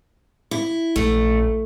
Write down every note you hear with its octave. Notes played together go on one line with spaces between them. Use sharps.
E4
A#1 A3